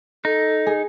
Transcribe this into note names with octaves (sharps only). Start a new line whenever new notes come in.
D#4 A4
G#4